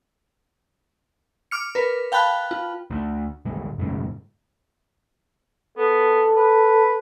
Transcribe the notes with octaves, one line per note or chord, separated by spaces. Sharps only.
D6 F6 C#7
A#4 B4
F5 G5 A5 B5 F#6
F4
D2
A2 D3 G3 G#3
F#2 A2 C#3 G#3
B3 A4
B4